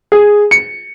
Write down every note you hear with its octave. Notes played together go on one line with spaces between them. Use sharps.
G#4
C#7